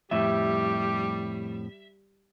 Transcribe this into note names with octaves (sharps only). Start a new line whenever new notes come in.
F2 A2 G3 G4 E5